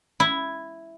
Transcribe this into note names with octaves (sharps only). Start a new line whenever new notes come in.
E4